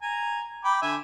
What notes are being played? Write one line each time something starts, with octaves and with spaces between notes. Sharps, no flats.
G#5 A#5
G5 B5 D6
D3 E5 G#5